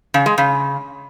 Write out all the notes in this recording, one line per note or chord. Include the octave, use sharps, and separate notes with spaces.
C#3
G#3
C#3